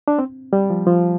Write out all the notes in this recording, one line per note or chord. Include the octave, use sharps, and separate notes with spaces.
D4
C4
G3
F3
F3